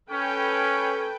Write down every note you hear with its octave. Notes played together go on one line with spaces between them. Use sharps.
C#4 A4 B4 G5